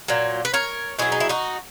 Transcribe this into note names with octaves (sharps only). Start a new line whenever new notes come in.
A#2 F#3
B4
A#4 C#5
B2 F#3 E4 G#4
D#4
E4
D#4 F#4